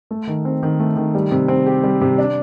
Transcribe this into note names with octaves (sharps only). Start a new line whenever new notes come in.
A3
D#3
C4
D#3
A3
D#3
G3
C3
C4
G4
G3
C3
D4